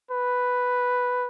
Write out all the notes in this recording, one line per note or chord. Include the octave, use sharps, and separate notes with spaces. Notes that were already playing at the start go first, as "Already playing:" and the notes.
B4